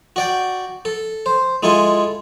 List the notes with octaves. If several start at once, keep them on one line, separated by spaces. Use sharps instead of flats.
F#4 D5 G5
A4
C5
G#3 E4 F4 A4 G#5